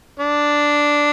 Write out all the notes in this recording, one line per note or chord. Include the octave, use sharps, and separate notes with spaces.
D4